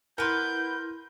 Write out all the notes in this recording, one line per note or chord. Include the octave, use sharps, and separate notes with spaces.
B3 E4 A#4 B4 C6 G6